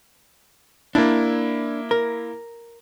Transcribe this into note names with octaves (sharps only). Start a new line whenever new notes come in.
A#3 D4 E4
A#4